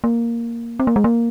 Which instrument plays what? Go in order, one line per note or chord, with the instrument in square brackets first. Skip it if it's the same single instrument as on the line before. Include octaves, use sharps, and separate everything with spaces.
[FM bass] A#3
C4
A#3
G#3
A#3